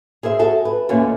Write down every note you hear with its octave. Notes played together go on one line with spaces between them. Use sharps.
G#4 A#4 C5 E5
F#4 G#4 A4 E5
B4
D#2 A#2 A3 A#3 C#4